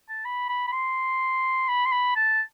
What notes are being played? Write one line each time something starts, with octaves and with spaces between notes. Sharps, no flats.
A5
B5
B5
B5
C6
B5
C6
B5
A5